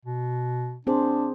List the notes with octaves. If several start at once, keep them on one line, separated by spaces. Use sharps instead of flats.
B2
C4 D4 G#4 C5